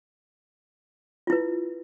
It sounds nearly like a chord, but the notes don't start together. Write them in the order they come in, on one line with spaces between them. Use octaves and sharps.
F4 E4 B4